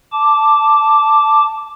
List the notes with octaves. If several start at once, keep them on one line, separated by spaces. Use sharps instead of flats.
A5 D6